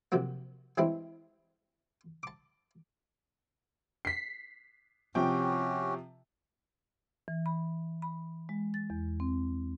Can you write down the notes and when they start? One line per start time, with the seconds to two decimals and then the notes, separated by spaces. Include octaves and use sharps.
0.12 C3 F3 F#3 A#3
0.78 E3 G3 G#3 C4 D4 E4
2.23 A5 D6
4.05 B6 C7
5.15 C3 F3 C#4 F#4 G4 G5
7.28 E3
7.46 B5
8.02 B5
8.49 G#3
8.74 A6
8.90 E2
9.20 C4